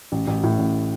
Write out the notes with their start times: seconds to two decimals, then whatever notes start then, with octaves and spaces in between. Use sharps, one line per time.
0.12 A1
0.27 A1
0.44 A2
0.58 A1